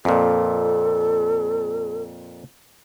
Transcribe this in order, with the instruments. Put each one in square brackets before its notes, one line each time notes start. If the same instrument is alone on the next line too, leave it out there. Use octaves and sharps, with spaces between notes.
[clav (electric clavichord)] F2 A#2 [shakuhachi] A4